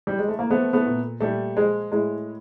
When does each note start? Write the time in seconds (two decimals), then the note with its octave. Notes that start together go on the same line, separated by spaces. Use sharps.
0.07 G3
0.19 G#3
0.28 A3
0.39 A#3
0.50 F3 A3 B3
0.73 A3 B3
0.86 A#2
1.21 A#2 G3 A3
1.57 F3 G#3
1.92 A2 G#3